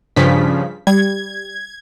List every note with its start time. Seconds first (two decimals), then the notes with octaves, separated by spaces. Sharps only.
0.16 G2 C#3 F3 B6
0.87 G3 G#6